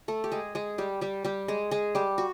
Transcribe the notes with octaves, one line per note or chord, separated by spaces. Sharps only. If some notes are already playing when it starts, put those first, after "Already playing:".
A3 A4
G4
G#3 G#4
G#3 G#4
G3 G4
G3 G4
G3 G4
G#3 G#4
G#3 G#4
G3 G4
F#4